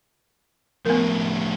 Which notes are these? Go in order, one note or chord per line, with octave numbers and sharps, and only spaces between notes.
A2 F3 B3 A#4